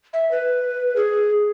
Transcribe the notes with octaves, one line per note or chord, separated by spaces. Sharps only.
E5
B4
G#4